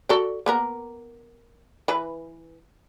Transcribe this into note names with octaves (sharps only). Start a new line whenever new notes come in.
F#4 A4 D5
A#3 B3 A#4
E3 B4